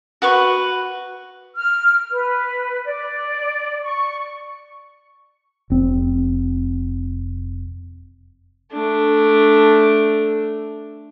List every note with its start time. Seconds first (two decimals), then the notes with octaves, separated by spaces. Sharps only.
0.22 F#4 B4 C#6
1.56 F6
2.12 B4
2.85 D5
3.83 C#6
5.70 F1 C4
8.72 A3 D4